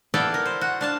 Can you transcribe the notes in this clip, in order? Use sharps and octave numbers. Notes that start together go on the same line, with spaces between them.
B3 E4 A4 D5 F5 G5
A#4
C5
F#4
D4 F5 A5